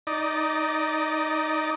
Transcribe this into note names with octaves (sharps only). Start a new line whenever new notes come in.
D#4 D5